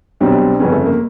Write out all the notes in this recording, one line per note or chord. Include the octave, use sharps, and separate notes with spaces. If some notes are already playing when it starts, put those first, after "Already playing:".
B1 B2 G3 C4 D4
G1 F2 C#3 B3 C#4
A3
A#3